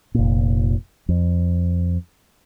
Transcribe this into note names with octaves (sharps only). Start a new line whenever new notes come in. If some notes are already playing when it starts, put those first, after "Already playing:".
F1 A#2
F2